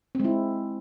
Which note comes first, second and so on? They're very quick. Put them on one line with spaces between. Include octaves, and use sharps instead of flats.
C4 G#3 E4